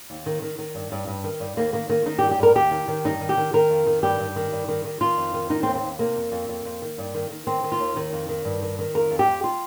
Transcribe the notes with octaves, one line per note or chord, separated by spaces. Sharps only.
D#2
D#3
D#3
D#3
G2
G2
G2
D#3
G2
D#2 A#3
D#3 A#3
D#3 A#3
D#3 D#4
G4
G2
G4
G2 A#4
D#2 G4
D#3
D#3
G2 D#4
D#3
G4
D#3
D#3 A#4
F2
D#3
G2 G4
G2
D#3
G2
D#3
D#3
D#3 F4
F2
D#3
D#3 D#4
C4
D#2
C4
D#2
C3 A#3
F2
F2
F2
F2
D#3
G2
D#3
D#3
D#3 C4
D#3
F4
D#2
D#3
F2
D#3
G2
D#3
D#3
F2 A#4
F2
G4
F2
F4